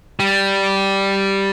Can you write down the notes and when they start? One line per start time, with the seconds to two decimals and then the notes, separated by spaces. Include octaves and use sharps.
0.20 G3